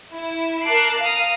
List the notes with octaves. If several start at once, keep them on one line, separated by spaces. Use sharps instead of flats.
E4
A#4 A5 D6 F#6 C7 D7
F5 A#5 D#6